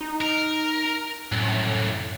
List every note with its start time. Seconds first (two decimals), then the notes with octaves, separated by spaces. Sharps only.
0.01 D#4
0.21 A#4
1.32 C2 F#2 A2